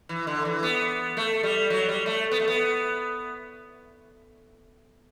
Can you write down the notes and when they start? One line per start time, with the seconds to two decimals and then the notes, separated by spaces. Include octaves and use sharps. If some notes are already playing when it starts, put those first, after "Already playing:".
0.09 E3
0.27 D3
0.45 E3
0.63 B3
1.17 A3
1.43 G3
1.70 F#3
1.88 G3
2.06 A3
2.31 B3
2.39 A3
2.48 B3